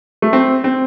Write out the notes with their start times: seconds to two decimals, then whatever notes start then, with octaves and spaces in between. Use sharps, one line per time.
0.22 A3
0.33 C4
0.64 C4